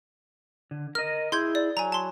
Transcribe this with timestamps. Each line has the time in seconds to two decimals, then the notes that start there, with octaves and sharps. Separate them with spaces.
0.71 D3
0.95 A#4 D#5 F6
1.32 E4 G#4 C6 G6 G#6
1.55 D5
1.77 F#3 G#5 A#5
1.92 A5 C6